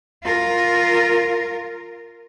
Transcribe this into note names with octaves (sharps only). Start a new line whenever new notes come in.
F4 A#4